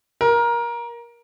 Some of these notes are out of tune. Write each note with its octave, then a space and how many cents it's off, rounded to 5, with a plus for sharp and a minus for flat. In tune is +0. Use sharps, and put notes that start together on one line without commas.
A#4 +20